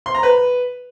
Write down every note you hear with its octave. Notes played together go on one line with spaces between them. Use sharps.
C6
A#5
B4